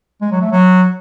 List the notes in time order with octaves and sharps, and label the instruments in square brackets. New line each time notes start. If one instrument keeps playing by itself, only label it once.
[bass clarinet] G#3
F#3
A3
F#3